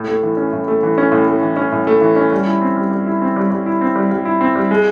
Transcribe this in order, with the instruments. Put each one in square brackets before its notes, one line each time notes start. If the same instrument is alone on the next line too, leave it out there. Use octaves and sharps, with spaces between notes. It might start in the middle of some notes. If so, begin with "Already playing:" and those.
Already playing: [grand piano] A2
A3
E3
C#4
A2
A3
E3
C#4
A2
A3
E3
C#4
A2
A3
E3
C#4
G3
E4
C4
G3
G3
E4
C4
G3
G3
E4
C4
G3
G3
E4
C4
G3
G#3